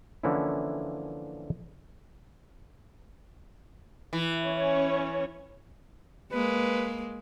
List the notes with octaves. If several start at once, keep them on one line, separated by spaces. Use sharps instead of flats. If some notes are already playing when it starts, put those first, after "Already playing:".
D3 E3 F3 A#3 C#4 E4
E3
C#4 C#5
G#3 A#3 B4